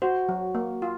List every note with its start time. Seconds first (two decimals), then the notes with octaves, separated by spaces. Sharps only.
0.02 F#4 C5
0.29 F#3
0.55 A#3
0.82 F4